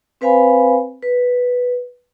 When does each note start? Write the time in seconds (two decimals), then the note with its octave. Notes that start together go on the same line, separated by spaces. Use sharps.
0.21 C4 B4 C5 F5 G#5 B5
1.02 B4